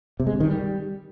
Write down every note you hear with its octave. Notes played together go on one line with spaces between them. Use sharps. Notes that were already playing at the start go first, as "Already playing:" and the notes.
C3
G#3
C#3
D#3
G3